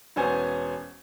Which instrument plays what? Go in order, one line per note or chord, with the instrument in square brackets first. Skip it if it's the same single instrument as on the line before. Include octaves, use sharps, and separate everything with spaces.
[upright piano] E1 B3 C#4 C5 G#5